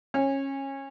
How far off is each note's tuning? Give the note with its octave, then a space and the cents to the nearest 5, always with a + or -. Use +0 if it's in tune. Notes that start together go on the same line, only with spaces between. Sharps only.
C#4 -20